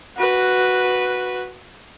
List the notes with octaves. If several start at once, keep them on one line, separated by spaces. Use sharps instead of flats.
F#4 B4